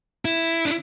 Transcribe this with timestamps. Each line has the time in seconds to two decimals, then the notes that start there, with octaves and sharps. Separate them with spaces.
0.25 E4
0.65 D4